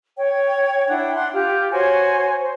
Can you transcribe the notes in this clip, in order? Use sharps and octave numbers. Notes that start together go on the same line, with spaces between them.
C#5 G5
D4 E4 F#5 G5
D4 F#5 C6
F4 G4
F#4 C5 C#5 G#5
C5